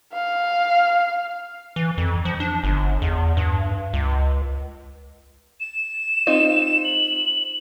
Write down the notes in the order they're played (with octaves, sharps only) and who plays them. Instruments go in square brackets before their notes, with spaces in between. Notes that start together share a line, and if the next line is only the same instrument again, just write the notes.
[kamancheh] F5
[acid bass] E3
F2
F3
D4
G1
E2
G2
C#2
[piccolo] E7
[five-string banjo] C4 D#4 F4
[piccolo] F#7